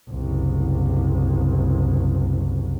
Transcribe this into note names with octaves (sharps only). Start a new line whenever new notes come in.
F#1 C2